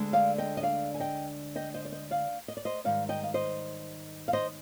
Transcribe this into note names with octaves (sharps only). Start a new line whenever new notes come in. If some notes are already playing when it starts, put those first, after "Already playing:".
Already playing: D2 D3 G#3 D4
D5 F5
D#5 G5
D#5
D5 F5
G#5
D#5 G5
D#5 G5
C5 D#5
D5
C5 D#5
D5 F5
D#5
D5
C5 D#5
G#2 D#3 G3 D5 F5
D#5 G5
F5
C5 D#5
F5
C5 D#5